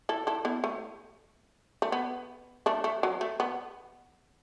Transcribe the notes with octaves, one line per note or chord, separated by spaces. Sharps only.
E4 A4
E4 A4
B3 E4
A3
A3
B3
A3 D4
A3
F#3
A3
B3